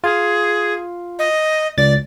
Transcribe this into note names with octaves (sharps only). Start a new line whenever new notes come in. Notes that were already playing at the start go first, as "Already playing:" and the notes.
F4 G#4
D#5
C#2 D5 A6